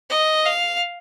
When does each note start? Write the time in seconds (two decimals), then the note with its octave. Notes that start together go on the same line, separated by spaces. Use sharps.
0.10 D#5
0.46 F5